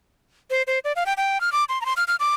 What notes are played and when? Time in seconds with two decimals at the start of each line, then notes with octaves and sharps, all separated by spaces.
0.50 C5
0.67 C5
0.85 D5
0.96 F5
1.06 G5
1.17 G5
1.41 F6
1.52 D6
1.69 C6
1.81 A#5
1.85 C6
1.97 F6
2.08 F6
2.20 D6